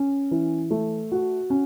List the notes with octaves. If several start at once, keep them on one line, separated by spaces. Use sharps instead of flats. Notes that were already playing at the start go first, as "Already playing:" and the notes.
Already playing: C#4
E3
A3
F#4
C#4